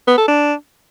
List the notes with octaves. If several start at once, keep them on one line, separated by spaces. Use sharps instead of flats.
B3
A4
D4